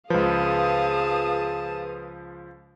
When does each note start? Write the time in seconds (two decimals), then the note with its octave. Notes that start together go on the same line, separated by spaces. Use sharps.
0.10 C#2 F3 G#4 B4 F5 A5 D#6